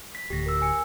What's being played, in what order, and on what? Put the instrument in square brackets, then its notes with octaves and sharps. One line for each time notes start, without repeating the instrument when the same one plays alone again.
[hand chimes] B6
[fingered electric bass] D1 D2 [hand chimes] G4 A#6
[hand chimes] A#4 E6
G#5 C#7